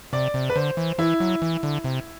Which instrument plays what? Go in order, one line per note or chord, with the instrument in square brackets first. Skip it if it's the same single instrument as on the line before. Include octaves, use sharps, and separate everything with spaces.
[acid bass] C3 [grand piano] D5
[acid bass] C3
[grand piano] B4
[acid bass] D3 [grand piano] C5
[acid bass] E3
[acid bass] E3 [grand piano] E4
[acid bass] F#3
E3
D3
C3